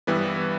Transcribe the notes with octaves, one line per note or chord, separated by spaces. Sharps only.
G2 E3 G3 B3 B4